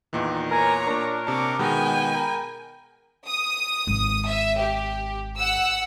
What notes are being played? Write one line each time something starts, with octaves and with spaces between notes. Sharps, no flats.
E2 A#2 D#3 E3
A#4 C#5 G#5 A#5
A#2 D4 A#4 C#6
C3 D4 A5 C#6 D6
B2 D#3 G#3 B3 G5 G#5
A#4 B5
D#6
G#1
E5
G4
F#5 E6